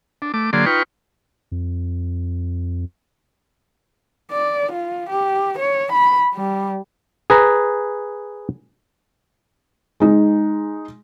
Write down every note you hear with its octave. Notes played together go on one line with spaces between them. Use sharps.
D4
A3 D6
D3 F#3 A#3 G#4 D5 C6
D#4 F4 B4 G5 C#6
F2
D5
F4
G4
C#5
B5
G3
G#4 B4 A#5
G#3 D#4